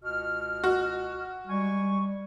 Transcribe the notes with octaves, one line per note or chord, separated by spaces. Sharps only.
C#2 B2 F6
F#4
G3 G#3 G#5 C#6